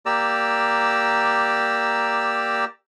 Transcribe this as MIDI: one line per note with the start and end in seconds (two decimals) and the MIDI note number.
0.06 2.65 58
0.06 2.65 67
0.06 2.65 74
0.06 2.65 82
0.06 2.65 88